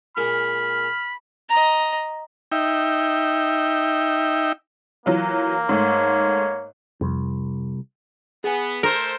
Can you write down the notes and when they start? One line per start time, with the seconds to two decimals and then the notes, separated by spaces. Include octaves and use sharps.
0.17 A#2 G#3 A#3 B5 F6
1.49 D#5 A#5
2.52 D#4 E5 G5
5.06 E3 F#3 A#3 F4
5.69 G#2 A3 C#5
7.01 C2 F2
8.44 B3 G#4 G#5
8.83 A3 A#4 C5